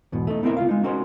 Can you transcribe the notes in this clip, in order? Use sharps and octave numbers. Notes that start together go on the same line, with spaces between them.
E2 G#2 B2
A3 D#4
B3 C4 E4 A#4 E5
C#2 F4 F5
G#3 D#4
C#4 D#4 F#4 G#4 A#4 C5